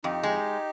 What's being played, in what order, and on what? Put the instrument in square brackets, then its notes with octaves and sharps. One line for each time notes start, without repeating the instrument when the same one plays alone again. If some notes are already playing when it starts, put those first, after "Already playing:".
[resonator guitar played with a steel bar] F2 [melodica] D#4 G4
[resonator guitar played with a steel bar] G#3